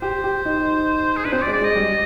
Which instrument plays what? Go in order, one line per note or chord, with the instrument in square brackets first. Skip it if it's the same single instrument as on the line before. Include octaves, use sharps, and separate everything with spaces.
[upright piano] G4 [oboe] C5
[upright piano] G4
D#4
[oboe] G#4
[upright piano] D4 [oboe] B4
[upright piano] C4 [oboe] C5
[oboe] D5
[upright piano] G#3
[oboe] D5
[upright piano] G#3 [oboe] D#5
[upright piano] G3